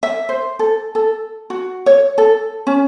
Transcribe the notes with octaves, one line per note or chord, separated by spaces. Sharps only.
E5
C5
A4
A4
F#4
C#5
A4
C#4